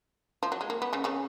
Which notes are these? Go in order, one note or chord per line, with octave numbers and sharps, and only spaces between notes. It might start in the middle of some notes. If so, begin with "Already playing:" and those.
F3
F#3
G#3
A#3
B3
C#3 C#4
C#3 C#4